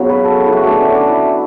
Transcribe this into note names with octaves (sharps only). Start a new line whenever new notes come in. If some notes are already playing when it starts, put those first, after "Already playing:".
Already playing: C#3 F#3 B3 C#5
B4
A4
E4
F#4
D3 A3 C#4 D4
C#4
D4
E4